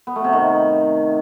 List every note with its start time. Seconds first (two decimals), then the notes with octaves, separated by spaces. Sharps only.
0.07 B3
0.16 A3
0.24 C3
0.33 D#3